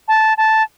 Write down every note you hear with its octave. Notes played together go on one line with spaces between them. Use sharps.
A5
A5